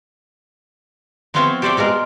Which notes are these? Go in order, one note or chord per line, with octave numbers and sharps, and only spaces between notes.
F3 B3 C4 F4 C#5 E5
G4 A4 C5 D5 E5 G5
B2 G#3 F4 A#4